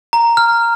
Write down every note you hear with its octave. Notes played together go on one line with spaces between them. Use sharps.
A#5
F6